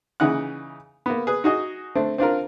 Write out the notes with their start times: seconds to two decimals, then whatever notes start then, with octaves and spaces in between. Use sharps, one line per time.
0.20 C#3 E3 D#4 F#5 F#6
1.06 A#3 B3
1.27 G#4 B4
1.44 D#4 F#4 G#4 D#5
1.95 A3 C4 D4
2.18 C4 D4 F4 A#4